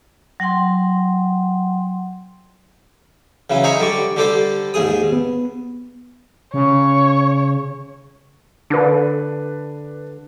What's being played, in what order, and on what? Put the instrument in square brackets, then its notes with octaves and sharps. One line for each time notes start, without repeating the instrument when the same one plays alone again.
[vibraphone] F#3 F#5 G5 C6
[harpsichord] C#3 E3 F#3 E4
C5 D#5 E5 G#5 A#5 C#6
D3 G3 D5 C#6
D3 G3 G4 A4 C5
D#2 G#2 G#4 D#6
[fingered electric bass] B3
[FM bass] C#3 [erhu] C#5
[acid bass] D3 [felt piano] D4 B4